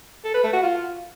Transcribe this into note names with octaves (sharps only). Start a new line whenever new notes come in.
A4
B4
A3
F#4
F4